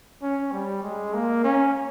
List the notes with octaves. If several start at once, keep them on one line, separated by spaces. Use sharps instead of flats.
C#4
G3
G#3
A#3
C#4